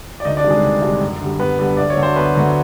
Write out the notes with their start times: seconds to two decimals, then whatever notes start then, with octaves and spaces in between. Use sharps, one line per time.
0.20 D5
0.25 D2 D#4 D#5
0.37 D4 D5
0.44 C3 D#3 G3
0.50 G#3 G#4
0.63 D2
0.82 C3 D#3 G3
1.01 F#2
1.21 D3 G3
1.39 F#2 B3 B4
1.59 D3 G3
1.77 D2 D5
1.90 C#5
1.97 D3 F#3 A3
2.03 C5
2.16 D2 B3 B4
2.35 D3 F#3 A3